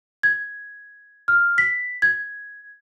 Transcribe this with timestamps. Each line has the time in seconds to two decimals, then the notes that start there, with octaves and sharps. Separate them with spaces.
0.23 G#6
1.28 F6
1.58 B6
2.02 G#6